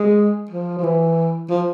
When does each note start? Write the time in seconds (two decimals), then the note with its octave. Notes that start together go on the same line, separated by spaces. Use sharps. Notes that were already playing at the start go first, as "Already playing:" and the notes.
Already playing: G#3
0.51 F3
0.79 F3
0.83 E3
1.50 F3